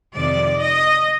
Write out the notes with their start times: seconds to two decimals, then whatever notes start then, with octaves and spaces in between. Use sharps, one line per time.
0.15 F2 C3 D#3 D5
0.58 D#5